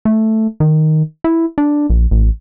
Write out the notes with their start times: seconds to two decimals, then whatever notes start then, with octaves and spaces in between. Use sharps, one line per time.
0.05 A3
0.60 D#3
1.24 E4
1.58 D4
1.90 A#1
2.11 A1